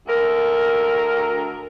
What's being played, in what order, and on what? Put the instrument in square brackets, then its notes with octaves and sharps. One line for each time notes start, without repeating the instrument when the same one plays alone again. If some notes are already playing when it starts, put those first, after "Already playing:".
[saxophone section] D2 A#4